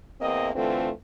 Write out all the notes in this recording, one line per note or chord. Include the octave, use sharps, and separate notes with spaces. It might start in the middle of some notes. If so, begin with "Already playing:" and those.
E2 A#3 C4 D#5
D3 E3 A3 C4 F4